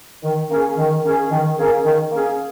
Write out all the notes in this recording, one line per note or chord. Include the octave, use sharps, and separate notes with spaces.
D#3
A#3 C#4 G#4
D#3
A#3 C#4 G#4
D#3
A#3 C#4 G#4
D#3
A#3 C#4 G#4